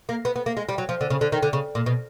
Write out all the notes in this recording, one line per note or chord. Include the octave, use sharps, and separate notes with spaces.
A#3
B3
B3
A#3
G#3
G3
F#3
F3
D3
C#3
D3
D#3
D3
C#3
A#2
B2